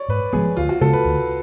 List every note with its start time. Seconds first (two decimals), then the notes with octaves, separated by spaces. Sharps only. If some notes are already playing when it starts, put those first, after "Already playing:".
Already playing: C#5 D5
0.09 G#2 B4
0.33 F3 G#3 B3 G#4
0.57 D2 F4
0.69 F#4
0.81 C#3 G#3 B3 A4
0.93 B4
1.05 D2